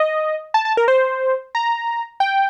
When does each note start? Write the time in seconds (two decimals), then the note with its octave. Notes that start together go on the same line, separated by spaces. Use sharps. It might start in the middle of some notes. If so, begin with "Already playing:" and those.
Already playing: D#5
0.54 A5
0.65 A5
0.77 A#4
0.88 C5
1.55 A#5
2.20 G5